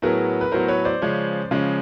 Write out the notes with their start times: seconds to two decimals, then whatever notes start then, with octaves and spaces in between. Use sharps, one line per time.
0.02 A2 F#3 B3 G#4 A#4
0.41 B4
0.52 A2 F#3 B3 A#4 C5
0.68 B4 C#5
0.85 C5 D5
1.02 C#3 F3 G#3 C#4
1.51 C#3 F3 G#3 C#4